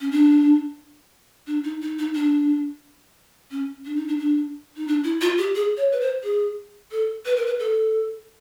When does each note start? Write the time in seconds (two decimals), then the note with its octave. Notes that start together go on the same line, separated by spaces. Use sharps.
0.01 C#4
0.11 D4
1.47 D4
1.64 D#4
1.82 D#4
1.99 D#4
2.15 D4
3.51 C#4
3.86 D4
3.96 D#4
4.08 D4
4.19 D4
4.77 D#4
4.87 D4
5.04 E4
5.21 F4
5.38 G4
5.55 G#4
5.77 C#5
5.92 B4
6.00 C5
6.23 G#4
6.92 A4
7.25 B4
7.36 A#4
7.46 B4
7.59 A4